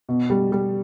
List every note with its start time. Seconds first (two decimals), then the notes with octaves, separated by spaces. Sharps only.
0.09 B2
0.30 G3
0.52 G3